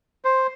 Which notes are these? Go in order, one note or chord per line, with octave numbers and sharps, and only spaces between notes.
C5